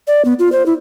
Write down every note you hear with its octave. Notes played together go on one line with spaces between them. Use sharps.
D5
B3
F4
C5
E4